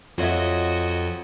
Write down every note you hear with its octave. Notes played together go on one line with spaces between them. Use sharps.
F2 F4 F#4 C#5 D#5 E5